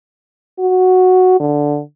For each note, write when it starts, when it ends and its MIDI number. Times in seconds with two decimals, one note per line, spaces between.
0.59 1.37 66
1.40 1.80 50